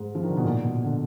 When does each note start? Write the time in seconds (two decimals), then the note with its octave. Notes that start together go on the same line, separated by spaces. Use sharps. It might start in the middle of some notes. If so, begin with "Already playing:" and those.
Already playing: G#2
0.15 F3
0.23 D#3
0.30 D3
0.37 B2
0.45 A#2
0.64 B2
0.84 D3